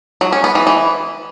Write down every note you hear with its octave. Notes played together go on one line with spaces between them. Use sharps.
F#3
C#4
B3
E3
E3